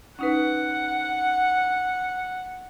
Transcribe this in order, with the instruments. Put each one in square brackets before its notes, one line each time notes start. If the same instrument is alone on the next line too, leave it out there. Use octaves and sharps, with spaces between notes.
[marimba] C#4 D#4 B4 [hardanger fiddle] F#5